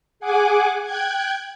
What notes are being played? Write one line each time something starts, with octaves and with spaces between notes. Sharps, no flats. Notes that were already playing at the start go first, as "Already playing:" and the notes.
G#4 F#5 G#5 D6
G5 F#6 G#6